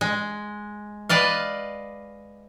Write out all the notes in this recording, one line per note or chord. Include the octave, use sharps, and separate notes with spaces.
G#3
B4 D5 D#5 F5